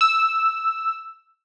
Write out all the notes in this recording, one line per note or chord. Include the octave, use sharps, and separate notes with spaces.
E6